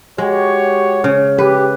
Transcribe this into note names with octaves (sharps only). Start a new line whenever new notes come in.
G#3 F#4 G4 C#5
C#3
G4 B4